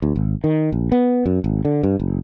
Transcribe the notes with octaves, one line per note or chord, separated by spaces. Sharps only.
D2
G#1
D#3
A#1
B3
F#2
G#1
D3
G2
F#1